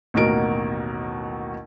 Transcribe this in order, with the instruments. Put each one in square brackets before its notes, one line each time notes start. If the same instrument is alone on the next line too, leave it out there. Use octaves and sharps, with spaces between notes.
[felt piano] A1 D#2 B2 F#4 A#4 D7